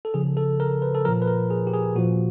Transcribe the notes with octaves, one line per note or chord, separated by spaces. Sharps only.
A4
C#3 F3 G#4
A4
A#4
B4
A4
A#2 F3 A#4
B4
A#4
G#4
G4
G#4
A#2 F3 F#4